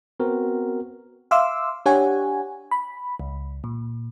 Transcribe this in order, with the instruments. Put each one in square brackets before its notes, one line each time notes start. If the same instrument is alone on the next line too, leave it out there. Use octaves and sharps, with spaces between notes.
[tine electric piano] B3 C4 F#4 A#4
[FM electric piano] E5 F5 C6 D6 E6
D4 G4 C#5 F#5 G#5
B5
C#2
A#2